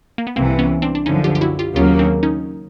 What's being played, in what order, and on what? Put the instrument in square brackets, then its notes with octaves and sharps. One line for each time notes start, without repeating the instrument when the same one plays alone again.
[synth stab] A#3
B3
[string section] C2 C3 E3 [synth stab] A#3 C4
[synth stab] B3 C#4
C4 D4
D4
[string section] F#2 D3 F3 [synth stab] C#4 D#4
[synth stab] F4 G4
G4
E4 F#4
F4 G4
[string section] D#2 C#3 F#3 A#3 [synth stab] F4 G4
[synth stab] C4 D4
C#4 D#4